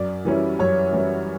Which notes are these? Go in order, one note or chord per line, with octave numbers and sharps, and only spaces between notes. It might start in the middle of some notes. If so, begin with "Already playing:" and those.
Already playing: F#2 D5
E3 G3 C#4 E4
F#2 C#5
E3 G3 C#4 E4